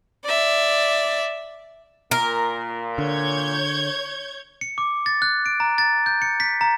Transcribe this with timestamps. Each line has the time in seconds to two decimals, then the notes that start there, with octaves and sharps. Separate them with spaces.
0.24 D5 E5
2.11 A#2 A#4
2.98 D3 C#5 G6 G#6
4.61 C#7
4.78 D6
5.06 A6
5.22 F#6
5.46 D7
5.60 A#5
5.78 A6
6.06 G6
6.22 C#7
6.40 B6
6.61 A#5